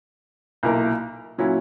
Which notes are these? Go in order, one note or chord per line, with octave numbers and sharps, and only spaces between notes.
B1 A#2 A#3 E4 A#4
A#2 F#3 C#4 E4